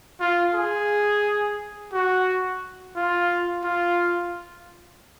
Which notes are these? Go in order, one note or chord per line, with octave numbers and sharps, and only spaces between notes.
F4
G#4
F#4
F4
F4